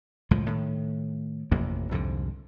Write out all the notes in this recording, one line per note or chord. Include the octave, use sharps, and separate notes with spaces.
C#2 A2 F3 G#3
A2 D#3
A1 F2 C3 A#3
C2 F2 G#2 D3